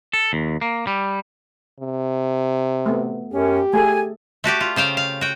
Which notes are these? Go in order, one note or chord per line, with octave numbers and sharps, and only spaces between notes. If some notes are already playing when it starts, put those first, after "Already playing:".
A4
D#2
A#3
G3
C3
A3 B3
F#2 C#4 G4
A3 G#4 A4 G#5
A3 F#4 G4 D5
F4
C#3 C5 F5 G5
F5
F#4 G5